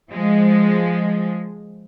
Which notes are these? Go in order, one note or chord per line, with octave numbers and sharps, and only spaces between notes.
F3 G#3